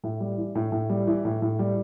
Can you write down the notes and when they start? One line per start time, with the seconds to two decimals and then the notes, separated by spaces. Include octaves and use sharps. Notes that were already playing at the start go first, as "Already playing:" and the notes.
0.04 A2
0.20 G3
0.38 E3
0.55 A2
0.72 A2
0.90 G3
1.07 E3
1.25 A2
1.42 A2
1.59 G3